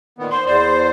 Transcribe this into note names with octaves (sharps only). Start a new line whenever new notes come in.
A#2 D#3 B3
C5 C6
E2 C5 D5